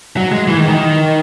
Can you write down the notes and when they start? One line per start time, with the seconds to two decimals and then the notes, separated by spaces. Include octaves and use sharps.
0.17 F#3
0.32 G#3
0.48 E3
0.57 D#3
0.68 D#3